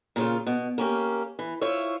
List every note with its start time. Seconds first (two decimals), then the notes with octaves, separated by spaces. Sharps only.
0.16 A#2 C#3 F4
0.46 B2
0.78 A#3 C#4 G4
1.39 E3
1.61 E4 F4 C5 C#5 E5